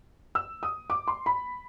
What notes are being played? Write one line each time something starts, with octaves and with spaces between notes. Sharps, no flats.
E6
D#6
D6
C6
B5